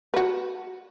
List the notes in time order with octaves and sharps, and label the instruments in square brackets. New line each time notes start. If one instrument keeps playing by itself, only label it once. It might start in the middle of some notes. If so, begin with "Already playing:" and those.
[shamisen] F#4 B4